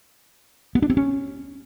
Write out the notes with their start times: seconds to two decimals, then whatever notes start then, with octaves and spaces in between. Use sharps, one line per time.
0.75 B3
0.82 D4
0.90 C4
0.97 C#4